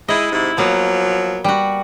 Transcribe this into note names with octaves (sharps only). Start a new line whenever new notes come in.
G#3 E4 D#5
G#2 C3 E4
F3 F#3 A#3 B3
G3 F#4